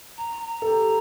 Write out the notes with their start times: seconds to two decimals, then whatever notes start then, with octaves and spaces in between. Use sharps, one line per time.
0.18 A#5
0.43 A#5
0.62 A4
0.67 G4